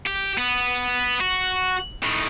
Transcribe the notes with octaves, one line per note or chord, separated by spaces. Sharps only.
G4
B3
F#4
A2 D#3